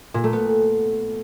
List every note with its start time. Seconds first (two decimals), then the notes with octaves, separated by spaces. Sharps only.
0.14 A#2
0.24 A3
0.33 B3